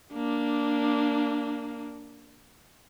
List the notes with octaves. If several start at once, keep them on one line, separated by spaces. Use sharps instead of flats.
A#3 D4